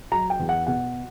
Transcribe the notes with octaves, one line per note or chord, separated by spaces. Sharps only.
F#3 A#5
G5
E2
F#5
B2 F#5